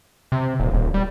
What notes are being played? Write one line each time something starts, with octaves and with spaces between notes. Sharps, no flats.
C3
D#1
D#1
G3